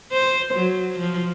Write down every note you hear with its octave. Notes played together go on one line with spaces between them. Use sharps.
C5
F#3
F3